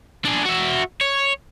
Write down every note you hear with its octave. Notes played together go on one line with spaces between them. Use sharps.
D4 G#4
F#4 E5
C#5